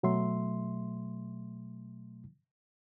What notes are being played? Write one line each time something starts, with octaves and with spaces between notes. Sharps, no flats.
B2 F#3 A3 E5 C6